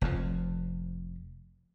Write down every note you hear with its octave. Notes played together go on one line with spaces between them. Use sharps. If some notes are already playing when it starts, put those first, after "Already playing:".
F1 F2 F3